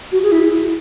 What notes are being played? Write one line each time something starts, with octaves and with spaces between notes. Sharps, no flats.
F#4
G#4
E4